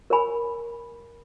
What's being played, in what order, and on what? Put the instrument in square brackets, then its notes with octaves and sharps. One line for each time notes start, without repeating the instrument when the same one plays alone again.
[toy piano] A#4 C#5 G#5 B5